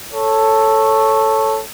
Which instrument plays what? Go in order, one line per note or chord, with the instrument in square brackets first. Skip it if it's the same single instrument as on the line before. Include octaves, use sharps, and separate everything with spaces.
[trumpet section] A4 C#5